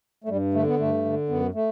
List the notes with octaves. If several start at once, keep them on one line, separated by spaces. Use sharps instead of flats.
A3
G2 G3
D3 A3
B3
G2 A3
D3
F#2 B3
A3